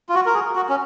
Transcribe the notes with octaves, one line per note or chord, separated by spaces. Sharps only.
F4
F#4
A#4
G#4
F#4
C#4